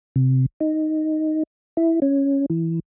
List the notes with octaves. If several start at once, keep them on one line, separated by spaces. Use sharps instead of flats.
C3
D#4
E4
C#4
E3